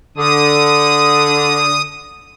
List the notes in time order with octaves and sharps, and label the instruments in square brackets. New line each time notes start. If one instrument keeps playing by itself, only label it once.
[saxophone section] D3 [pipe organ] D#6